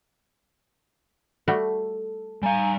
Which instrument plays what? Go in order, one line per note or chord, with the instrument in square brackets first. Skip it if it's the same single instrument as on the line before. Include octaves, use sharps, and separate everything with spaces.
[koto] G3 A3 F#4 [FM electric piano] A4
[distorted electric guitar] G3 F5 [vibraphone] G#5 A#5